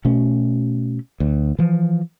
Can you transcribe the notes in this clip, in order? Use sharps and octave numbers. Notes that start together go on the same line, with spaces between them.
B2 A3 C#4
D2
E3 F3